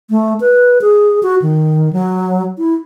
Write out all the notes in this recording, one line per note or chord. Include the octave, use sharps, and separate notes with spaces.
A3
B4
G#4
F#4
D#3
F#3
E4